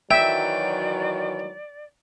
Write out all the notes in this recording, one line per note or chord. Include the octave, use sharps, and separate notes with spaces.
D#3 E3 F#3 D5 E5 G5